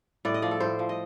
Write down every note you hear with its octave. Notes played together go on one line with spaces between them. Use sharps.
A2 D5
D#5
F3 D5
A4
A2 C5
F3
D#5